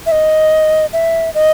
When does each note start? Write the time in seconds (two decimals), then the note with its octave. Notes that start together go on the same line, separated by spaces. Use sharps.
0.06 E5
0.12 D#5
0.93 E5
1.34 D#5